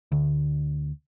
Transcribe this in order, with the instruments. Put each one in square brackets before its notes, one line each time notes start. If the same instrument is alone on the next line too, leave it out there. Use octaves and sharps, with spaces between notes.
[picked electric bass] D2 D3